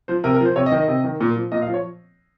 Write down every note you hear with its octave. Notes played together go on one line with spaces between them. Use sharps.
F3 C5
C3 A#4
A#4
F3 C5
C3 C#5
D#5
D#3
D#5
C3
D#3
A#2
F3
A#2 D#5
F5
F3
C#5